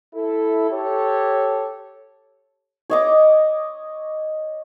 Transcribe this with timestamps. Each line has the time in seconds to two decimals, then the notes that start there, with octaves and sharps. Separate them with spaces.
0.14 E4 A4
0.71 G4 A4 C#5
2.90 C#5 D#5 D6